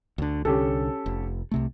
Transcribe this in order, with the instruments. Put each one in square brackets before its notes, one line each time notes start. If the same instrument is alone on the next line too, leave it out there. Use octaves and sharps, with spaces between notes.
[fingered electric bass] D2 D3
[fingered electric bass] C2 D3 [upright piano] C#4 G4 A4
[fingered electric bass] F1
C2 C3 A3